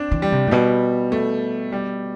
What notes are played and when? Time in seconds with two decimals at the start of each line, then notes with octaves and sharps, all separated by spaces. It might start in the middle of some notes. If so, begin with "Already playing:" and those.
Already playing: C4 D4
0.11 E3
0.22 G3
0.32 C3
0.47 A2
0.51 B2 G3
1.12 A3
1.72 G3